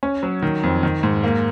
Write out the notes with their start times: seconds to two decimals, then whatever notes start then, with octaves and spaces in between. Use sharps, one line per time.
0.03 C#4
0.23 F#3
0.42 D#3
0.63 F2
0.83 D#3
1.03 G#2
1.24 A#3